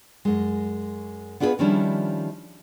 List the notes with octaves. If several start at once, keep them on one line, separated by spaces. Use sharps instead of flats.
F#2 G#3
B3 D4 F4 G#4 A4 B4
D#3 F3 G3 C#4 D4 E4